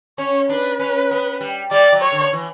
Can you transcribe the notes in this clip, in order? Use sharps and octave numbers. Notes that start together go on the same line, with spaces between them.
C#4 C#5
D4 B4
C#4
B3
G3
G3 D5
F#3
C#5
D3
E3